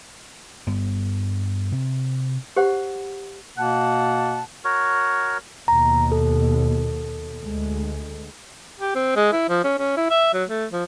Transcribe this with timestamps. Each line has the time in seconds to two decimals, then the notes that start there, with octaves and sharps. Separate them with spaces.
0.67 G2 B3
1.72 C3
2.56 G4 C5 F#5
3.57 B2 A#3 F#5 A5
4.65 F#4 A#4 C#5
5.68 D#2 B2 A#5
6.12 A4
7.40 D2 G#3
8.80 G4
8.95 C4
9.16 G#3
9.33 E4
9.49 F3
9.64 C#4
9.79 C#4
9.97 E4
10.10 E5
10.34 F#3
10.49 A3
10.72 F3